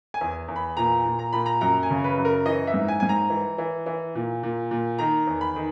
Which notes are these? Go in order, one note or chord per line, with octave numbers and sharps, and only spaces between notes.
G#5
E2
E2
B5
A#2 A#5
A#2
A#5
A#2 B5
A#5
F#2 A#5
G#5
C#3
B4
F#2
A#4
E3 D#5
E5
G#2
G#5
G#2 G#5
A#5
E3
E3
E3
A#2
A#2
A#2
D#3 A#5
E2
B5
D#3